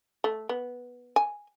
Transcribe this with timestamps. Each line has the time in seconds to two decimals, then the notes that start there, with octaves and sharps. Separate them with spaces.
0.24 A3
0.49 B3
1.16 G#5